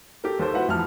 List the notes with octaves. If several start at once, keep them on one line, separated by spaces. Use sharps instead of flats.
G4 A4 A#4
D#2 A4 C5
E4 F#4 B4 C5 F#5
F1 D2 E3 F3 A5 F6